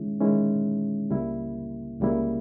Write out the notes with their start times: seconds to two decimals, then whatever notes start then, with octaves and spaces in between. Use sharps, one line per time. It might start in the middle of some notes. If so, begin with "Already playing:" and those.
Already playing: D#3 G#3 C#4 E4
0.20 D#3 G#3 C#4 E4
1.11 C#2 C#3 G3 A#3 E4
2.00 C#2 C#3 G3 A#3 E4